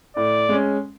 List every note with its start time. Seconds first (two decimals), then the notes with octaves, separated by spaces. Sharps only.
0.16 A2 D5
0.49 G#3 C#4